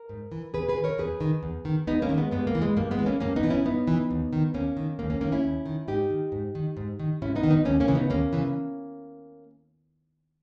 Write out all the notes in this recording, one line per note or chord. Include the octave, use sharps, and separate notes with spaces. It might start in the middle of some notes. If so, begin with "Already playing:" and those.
Already playing: A#4
G#2
E3
E2 G#4 B4
G#4 B4
D#3
A#4 C#5
E2 G#4 B4
D#3
E2
D#3
E2 B3 D#4
A#3 C#4
D#3
G#3 B3
G2 G#3 B3
A#3
E3
G#3
G2 A#3
G#3 B3
E3
A#3 C#4
G2 A#3 C#4
B3 D#4
E3
C#4 E4
G2 B3 D#4
E3
D#2
D#3
D#2 A#3 C#4
D#3
D#2 A#3
A#3 C#4
D#3 A#3 C#4
C#4 E4
D#2
D#3
G#2 D#4 G4
D#3
G#2
D#3
G#2
D#3
G#2 C#4 E4
B3 D#4
D#3
B3 D#4
D#2 A#3 C#4
A#3 C#4
C#3 E3
B3 D#4
D#2 A#3 C#4
C#3 E3